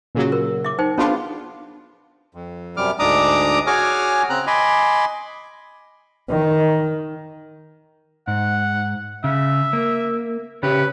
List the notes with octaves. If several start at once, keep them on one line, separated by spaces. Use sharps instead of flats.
A#2 C#3 F#3
A#4
E5 D6
D#4 C5 G5
B3 C#4 D4 F4 G#4
F2
F#2 C3 G3 D6 F6
D2 G#2 D4 A#5 D6 D#6
F#4 G#4 C#5 G#5 D6 F6
C#3 C4 A#5 F#6
D#5 G#5 B5 C6 D6
D#3
G#2 F#5
C#3 E5
A#3
C#3 C#4 G4 B4